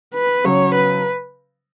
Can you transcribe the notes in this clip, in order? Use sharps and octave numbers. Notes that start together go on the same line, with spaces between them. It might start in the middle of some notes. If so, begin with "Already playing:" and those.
B4
C#3 F#3 C#5
B4